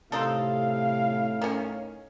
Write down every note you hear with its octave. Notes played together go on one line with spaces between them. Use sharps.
A2 C3 C4 D#4 A4 F5
D#3 C#4